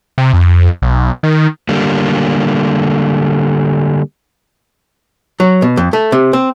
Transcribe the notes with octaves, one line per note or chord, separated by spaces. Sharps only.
C3
F2
B1
D#3
D3 G3 A#3
F#3
B2
F2
A3
C3
C4